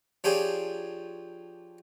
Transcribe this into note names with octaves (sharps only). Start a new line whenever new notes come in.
F3 D4 F4 G4 G#4 C#5